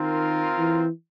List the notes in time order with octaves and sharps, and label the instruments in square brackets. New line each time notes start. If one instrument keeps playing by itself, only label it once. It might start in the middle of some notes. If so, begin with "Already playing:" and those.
Already playing: [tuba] D#3 [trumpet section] C4 F4 A#4
[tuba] E3